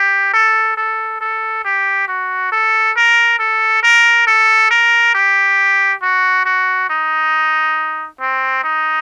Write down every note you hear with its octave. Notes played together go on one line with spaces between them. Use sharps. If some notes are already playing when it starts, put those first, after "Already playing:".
Already playing: G4
A4
A4
A4
G4
F#4
A4
A#4
A4
A#4
A4
A#4
G4
F#4
F#4
D#4
C4
D#4